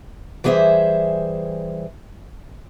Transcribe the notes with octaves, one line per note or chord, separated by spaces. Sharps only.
E3 G3 G#4 C5 E5